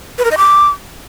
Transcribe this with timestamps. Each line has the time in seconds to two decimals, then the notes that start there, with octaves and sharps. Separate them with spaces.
0.18 B4
0.25 A#4
0.31 D#5
0.38 D6